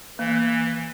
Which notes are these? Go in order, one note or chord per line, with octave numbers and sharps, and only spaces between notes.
E3 A#3